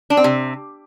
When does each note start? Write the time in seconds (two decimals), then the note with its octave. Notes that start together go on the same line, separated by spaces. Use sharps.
0.10 D4
0.17 C4
0.24 C3